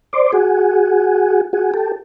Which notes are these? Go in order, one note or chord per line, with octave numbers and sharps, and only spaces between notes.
C5 D5
F#4 G#4
F#4 G#4
G4 A4